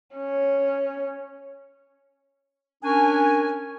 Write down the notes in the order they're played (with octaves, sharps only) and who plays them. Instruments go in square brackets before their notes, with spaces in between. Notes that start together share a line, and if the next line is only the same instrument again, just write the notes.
[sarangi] C#4
[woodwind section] C#4 D4 A#4 G#5